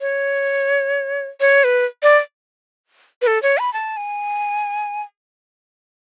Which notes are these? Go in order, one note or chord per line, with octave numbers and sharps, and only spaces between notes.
C#5
C#5
B4
D5
B4
A4
C#5
B5
A5
G#5